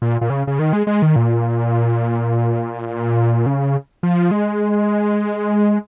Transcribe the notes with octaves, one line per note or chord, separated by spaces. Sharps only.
A#2
A#2
C#3
C#3
D#3
G#3
G#3
D#3
A#2
C#3
F3
G#3